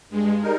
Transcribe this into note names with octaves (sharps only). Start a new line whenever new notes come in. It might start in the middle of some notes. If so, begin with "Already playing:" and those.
G2 G#3
G3 D#4 A#4